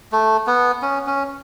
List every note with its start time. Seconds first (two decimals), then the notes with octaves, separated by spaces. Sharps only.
0.12 A3
0.47 B3
0.82 C#4
1.07 C#4